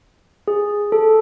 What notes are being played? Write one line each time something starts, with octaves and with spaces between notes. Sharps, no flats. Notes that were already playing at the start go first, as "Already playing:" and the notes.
G#4
A4